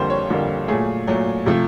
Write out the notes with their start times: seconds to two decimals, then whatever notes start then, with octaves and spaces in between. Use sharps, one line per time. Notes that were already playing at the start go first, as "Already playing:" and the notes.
Already playing: F2 D3 G3 A#3 C5
0.10 C#5
0.30 F2 D3 G3 A#3
0.68 A#2 F#3 A3 G#4
1.07 A#2 F#3 A3
1.46 C3 F3 A3